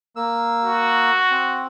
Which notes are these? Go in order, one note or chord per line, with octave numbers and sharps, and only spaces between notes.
A#3 E6
F#4
C4